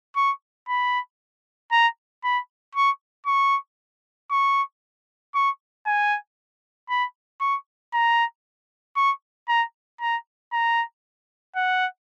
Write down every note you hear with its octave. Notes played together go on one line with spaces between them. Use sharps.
C#6
B5
A#5
B5
C#6
C#6
C#6
C#6
G#5
B5
C#6
A#5
C#6
A#5
A#5
A#5
F#5